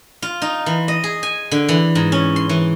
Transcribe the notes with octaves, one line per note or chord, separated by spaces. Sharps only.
F4
D#4
E3
D#5
G#4
G#5
D3
E3
G#2
C#4
C6
E3